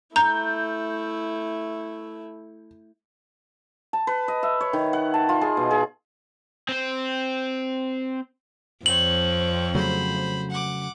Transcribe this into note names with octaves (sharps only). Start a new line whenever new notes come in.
A3 E4 A#5 G6
A5
B4
D#5
E5
C#5
D#3
F#5
A5
F4
G#4
B2
G#4
C4 C5
F2 C4 C#5 F#7
C#3 F#3 A3 C5 B5
F#5 D6